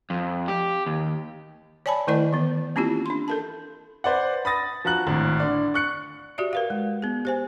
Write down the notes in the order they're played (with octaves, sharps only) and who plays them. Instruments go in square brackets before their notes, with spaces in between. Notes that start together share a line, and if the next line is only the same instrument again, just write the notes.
[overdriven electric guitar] F2
G4
D#2
[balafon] C#5 D5 G#5 A5 B5
D#3 A3 E4 A#4 D5 D#5
D#3 E3 B3
A#3 C4 C#4 E4 F4 G4
D4 C6
A4 A#4 A5
[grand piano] B4 C5 D5 F#5
B5 D#6 A6 A#6
F3 F#4 A#5 F#6 F#7
G#1 A2
D3 D5
C#6 F#6 C#7
[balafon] F#4 G4 D5 E5
A#4 B4 F5
G#3
B3 G#4
G4 C5 G#5